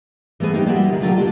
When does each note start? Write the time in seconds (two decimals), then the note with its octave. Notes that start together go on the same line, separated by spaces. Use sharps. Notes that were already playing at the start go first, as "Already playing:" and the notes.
0.40 E3 A3 B3 G#4 B4
0.54 A#3 D#4 G4
0.66 G3 G#3 A#3 F4 F#4 E5
0.88 E2 D#3
1.00 D3 F#3 A3 F4 G4 A#4
1.16 G#3 D4 F4